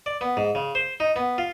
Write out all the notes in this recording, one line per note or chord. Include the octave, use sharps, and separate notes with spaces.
D5
B3
G#2
C#3
C5
D#4
B3
F4